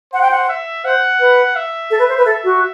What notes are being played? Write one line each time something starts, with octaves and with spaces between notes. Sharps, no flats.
C5 F#5
G5
F#5
E5
C5 F#5
B4
E5
A4
B4
C5
B4
A4 E5
F#4